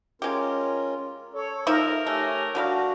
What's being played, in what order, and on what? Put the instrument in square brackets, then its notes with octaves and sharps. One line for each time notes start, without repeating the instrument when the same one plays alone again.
[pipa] G#3 G4 [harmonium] C#4 F4 A#4
[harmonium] A4 [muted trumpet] C#5
[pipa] F3 D#4 E5 [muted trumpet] A#4
[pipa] A3 [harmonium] G4 C#5 G#5
[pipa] D3 G3 F5 [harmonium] D4 F#4